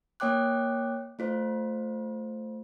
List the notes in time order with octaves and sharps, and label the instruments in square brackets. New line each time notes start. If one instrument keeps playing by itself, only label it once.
[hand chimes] A#3 C#5 G5 D6 F#6
A3 F4 C5